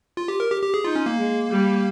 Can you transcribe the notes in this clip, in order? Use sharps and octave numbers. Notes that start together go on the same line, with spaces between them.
F4
G4
A#4
G4
G4
G#4
D#4 F4
C#4
A#3
G#3
G3